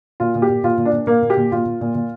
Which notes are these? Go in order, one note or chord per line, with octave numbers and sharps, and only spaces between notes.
A#2 F4
A#2
G4
A#2
A#2 F4
A#2
D4
A#2
A#2 A#3
A#2
G4
A#2
A#2 F4
A#2
A#2
A#2